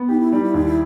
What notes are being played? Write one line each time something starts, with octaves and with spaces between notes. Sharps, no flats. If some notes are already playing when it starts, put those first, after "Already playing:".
Already playing: B3
D#4 G4
E4
G3 D#4
E4
D#2 D#4
E4